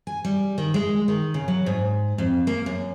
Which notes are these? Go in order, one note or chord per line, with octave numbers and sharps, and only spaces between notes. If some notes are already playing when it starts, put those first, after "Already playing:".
G#5
G3
D#3
G#3
D#3
C#3
F#3
G#2
F2
A#3
F#2